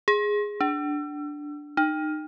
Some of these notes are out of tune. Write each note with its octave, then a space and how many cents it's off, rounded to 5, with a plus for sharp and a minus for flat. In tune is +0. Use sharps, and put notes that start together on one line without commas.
G#4 -5
D4 +0
D#4 -25